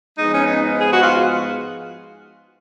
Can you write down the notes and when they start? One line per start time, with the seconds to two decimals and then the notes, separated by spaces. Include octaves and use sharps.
0.18 G#2 F3 G#3 B3 D#4
0.32 C#4
0.45 D#4
0.80 G#4
0.90 F#4
1.01 F4